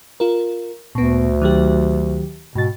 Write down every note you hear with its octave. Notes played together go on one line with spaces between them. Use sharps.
F4 A#4
D2 A#2 B3
D#3 F#3 G4
G#2 B2 A6